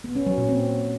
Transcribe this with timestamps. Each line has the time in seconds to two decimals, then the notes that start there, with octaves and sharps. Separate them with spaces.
0.04 B3
0.15 C#4
0.27 F#3
0.38 A#2
0.49 C4